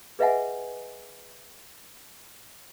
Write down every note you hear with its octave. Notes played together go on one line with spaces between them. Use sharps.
G#4 B4 D#5 E5 F#5 G#5